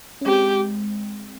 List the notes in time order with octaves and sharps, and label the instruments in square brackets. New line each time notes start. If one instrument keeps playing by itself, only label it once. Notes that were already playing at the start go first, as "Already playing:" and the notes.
[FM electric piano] C#4
[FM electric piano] G#3 C4 [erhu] G4